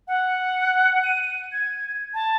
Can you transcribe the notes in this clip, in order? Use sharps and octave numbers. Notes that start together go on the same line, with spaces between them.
F#5
D#7
G#6
A5